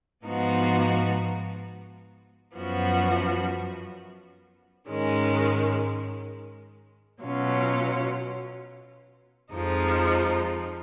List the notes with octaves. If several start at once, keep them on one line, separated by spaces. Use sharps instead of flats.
G#2 F3 B3 D#4 F#4
F#2 F3 B3 F#4
G#2 D#3 G#3 C#4
B2 F#3 C#4 F4
F2 F3 G#3 D#4